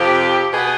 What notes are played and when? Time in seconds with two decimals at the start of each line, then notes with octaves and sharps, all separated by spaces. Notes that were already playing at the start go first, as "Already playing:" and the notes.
Already playing: F2 C3 F3 G4
0.53 B2 B3 G#4